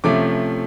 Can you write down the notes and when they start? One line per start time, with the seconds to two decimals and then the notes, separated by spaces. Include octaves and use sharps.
0.04 C3 F3 A3 C#4 D6